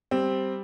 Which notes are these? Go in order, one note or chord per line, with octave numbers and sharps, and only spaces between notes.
G3 C4